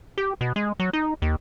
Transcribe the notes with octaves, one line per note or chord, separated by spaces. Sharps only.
G4
B2
G#3
F#3
D#4
D#2